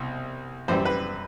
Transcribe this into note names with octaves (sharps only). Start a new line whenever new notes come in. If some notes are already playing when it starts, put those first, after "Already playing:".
Already playing: C2 B2
F#2 E3 G3 C5
B4